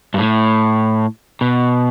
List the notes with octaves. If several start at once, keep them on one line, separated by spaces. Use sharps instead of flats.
G2
A2
B2